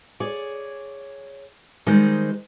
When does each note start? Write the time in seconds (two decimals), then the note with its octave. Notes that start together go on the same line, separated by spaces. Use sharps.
0.20 G#4 C#5 D5
1.87 D#3 G3 G#3 D#4 C5 D5